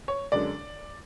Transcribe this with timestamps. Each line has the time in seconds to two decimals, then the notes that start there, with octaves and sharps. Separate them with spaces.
0.08 C#5
0.32 F#2 D3 G#3 D5